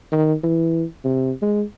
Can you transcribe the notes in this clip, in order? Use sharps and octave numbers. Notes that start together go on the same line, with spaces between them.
D#3
E3
C3
G#3